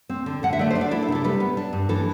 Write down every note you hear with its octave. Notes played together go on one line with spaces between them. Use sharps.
C4
D3
D3 F#5
E5
A3 D5
C5
D4
D5
E4 A4
A4
C3
A4
G3 B4
B3
D4
G2
E3 A4